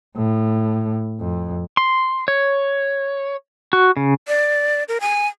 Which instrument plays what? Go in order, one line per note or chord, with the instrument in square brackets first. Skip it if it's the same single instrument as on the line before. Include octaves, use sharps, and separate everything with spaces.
[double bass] A2
F2
[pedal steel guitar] C6
C#5
F#4
C#3
[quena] D5
A#4
G#5